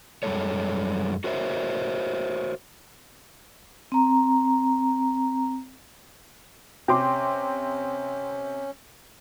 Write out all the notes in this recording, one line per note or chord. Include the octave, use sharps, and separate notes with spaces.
F#2 G3 G#3 A4 C#5
F#4 A#4 C5 C#5 E5
C4 A#5
C3 C#4 G5 C6 D6